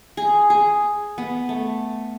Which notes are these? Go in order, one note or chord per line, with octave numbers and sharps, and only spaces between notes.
G#4
G#4
B3
A3